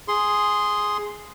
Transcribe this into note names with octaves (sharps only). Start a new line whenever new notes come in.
G#4 C6